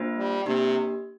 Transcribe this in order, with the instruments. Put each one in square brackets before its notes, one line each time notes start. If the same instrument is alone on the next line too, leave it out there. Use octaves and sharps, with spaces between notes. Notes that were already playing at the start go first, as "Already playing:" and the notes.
Already playing: [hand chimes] A#3 D4 F4 C5
[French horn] G3
[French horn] C3 [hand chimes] A#3 D4 G4